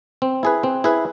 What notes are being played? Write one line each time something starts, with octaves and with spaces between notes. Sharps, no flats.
C4
E4 G#4 B4
C4
E4 G#4 B4